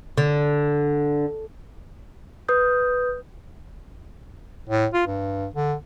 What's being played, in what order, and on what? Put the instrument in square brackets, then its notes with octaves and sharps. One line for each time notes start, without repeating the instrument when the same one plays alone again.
[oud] D3
[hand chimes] B4 D#6 G6
[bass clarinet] A2
F4
G2
D3